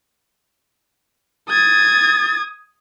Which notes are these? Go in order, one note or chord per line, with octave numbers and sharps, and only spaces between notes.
D#6 G#6 A6